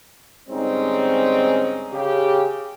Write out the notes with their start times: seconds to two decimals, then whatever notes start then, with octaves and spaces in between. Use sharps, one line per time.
0.49 G#2 D3 G3 C4 C#4 D#4
1.92 C#3 G4